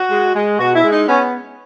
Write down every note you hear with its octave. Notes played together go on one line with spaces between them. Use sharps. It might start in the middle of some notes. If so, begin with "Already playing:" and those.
Already playing: F#4
G#3
G#3
B2 F#4
E4
G#3
D#4
B3 C#4